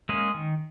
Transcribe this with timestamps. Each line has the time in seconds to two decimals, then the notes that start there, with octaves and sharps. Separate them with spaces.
0.09 G#3 A#3 C#4 G#4
0.34 D#3